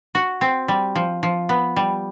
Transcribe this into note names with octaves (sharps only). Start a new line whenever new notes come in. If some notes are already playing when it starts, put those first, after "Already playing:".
F#4
C4
G3
F3
F3
B3
G3